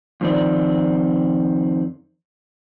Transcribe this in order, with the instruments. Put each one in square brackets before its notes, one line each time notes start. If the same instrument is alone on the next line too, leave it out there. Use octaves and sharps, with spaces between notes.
[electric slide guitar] F2 D#3 C4 D5